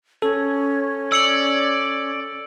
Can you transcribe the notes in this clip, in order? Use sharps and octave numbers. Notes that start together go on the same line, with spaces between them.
C#4 A4
D5 E6 C#7 F#7